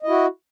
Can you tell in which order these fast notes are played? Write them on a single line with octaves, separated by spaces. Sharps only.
D#5 E4 F#4